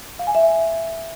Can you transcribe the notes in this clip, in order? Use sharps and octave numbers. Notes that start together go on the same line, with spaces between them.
F5
G#5
E5